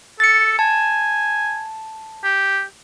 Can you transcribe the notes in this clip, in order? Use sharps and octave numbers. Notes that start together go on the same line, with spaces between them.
A4 A6 C#7
G#5 A5
G4